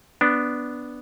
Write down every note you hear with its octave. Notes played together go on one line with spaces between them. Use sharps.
B3 D4